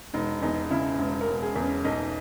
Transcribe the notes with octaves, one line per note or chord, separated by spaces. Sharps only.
E1 D#4
E2 D#4
C#3 E4
E1
A#4
E1
G#4
E2
C#4
B1 D#4